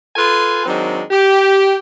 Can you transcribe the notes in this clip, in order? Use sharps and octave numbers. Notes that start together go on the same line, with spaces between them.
F4 A4 B4 G#5 C6
D#3 F#3 G#3 C4 D4
G4